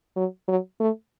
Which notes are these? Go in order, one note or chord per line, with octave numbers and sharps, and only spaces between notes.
F#3
F#3
A3